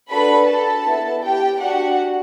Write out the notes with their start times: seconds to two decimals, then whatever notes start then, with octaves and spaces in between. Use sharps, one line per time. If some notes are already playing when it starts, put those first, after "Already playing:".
0.09 D4 F#4 A4 B4 B5
0.47 A4 A5
0.85 B3 E4 A4
1.23 G4 G5
1.60 D4 F#4 G4 F#5